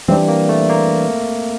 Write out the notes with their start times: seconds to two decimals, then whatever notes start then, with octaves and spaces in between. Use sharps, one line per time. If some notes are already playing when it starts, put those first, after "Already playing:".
0.08 E3 G3 C4 D4
0.28 A#3
0.49 A3
0.69 A#3